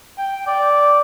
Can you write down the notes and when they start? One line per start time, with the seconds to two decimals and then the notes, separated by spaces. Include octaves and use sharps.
0.18 G5
0.47 D5